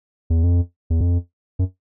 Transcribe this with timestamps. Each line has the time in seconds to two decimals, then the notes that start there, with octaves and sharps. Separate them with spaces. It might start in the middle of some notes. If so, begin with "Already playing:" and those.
0.30 E2
0.43 F2
0.90 E2
1.00 F2
1.59 F#2